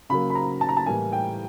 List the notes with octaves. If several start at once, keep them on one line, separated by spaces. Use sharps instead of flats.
C#3 F#3 A#3 B5
B5
A#5
A5
A#5
A5
A2 E3 G3 A#3 G#5
G5